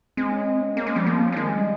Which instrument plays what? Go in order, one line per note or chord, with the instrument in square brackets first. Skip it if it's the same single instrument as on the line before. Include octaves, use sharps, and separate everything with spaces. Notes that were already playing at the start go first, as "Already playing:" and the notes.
[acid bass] G#3 [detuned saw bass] C4
[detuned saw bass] C#4
C4
C#4
[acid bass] A#3 [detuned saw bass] C#4
[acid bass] G#3 [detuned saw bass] C4
[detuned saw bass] F3 [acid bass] G3
[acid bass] F3 [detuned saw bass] A#3
[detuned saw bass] C4
C#4
[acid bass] G3
[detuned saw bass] D#3 [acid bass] G#3
[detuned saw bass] G3